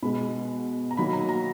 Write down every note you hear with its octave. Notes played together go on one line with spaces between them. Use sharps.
B2 G#3 B5
A#5
D#3 F#3 A#3 B5
A#5
A#5